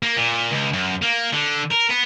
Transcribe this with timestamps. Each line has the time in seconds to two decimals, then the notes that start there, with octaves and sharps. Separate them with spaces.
0.03 A#3
0.17 A#2
0.51 C#2
0.73 F#2
1.02 A#3
1.33 D3
1.72 A#4
1.90 B3